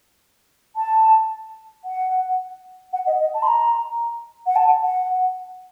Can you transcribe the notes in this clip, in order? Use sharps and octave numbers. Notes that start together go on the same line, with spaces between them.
A5
F#5
F#5
D#5
D#5
A5
C6
A#5
F#5
A5
F#5